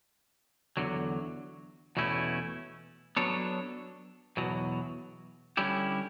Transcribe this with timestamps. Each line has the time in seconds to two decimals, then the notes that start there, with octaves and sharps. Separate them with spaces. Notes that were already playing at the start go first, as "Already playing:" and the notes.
0.77 E2 D3 F#3
1.97 E2 B2 A3 C#4 E4
3.17 F#3 B3 D4 A4 C#5
4.37 E2 B2 F#3
5.57 D3 G3 C#4 E4 G4